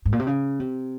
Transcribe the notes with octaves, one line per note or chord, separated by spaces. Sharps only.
G#2
A#2
C3
C#3
C3